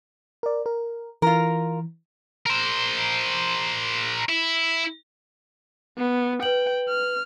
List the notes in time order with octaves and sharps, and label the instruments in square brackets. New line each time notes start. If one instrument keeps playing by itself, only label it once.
[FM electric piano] A#4 D5
A#4
[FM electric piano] E3 [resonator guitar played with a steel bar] F4 A#4
[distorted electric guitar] A#4 C5
E4
[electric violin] B3
[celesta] B4 F#7 [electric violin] G5
[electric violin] F6